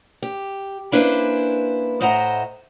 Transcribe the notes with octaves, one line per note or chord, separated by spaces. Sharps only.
G4
A#3 C#4 D4 E4 B4 C5
A2 C5 D#5 E5 F#5 A#5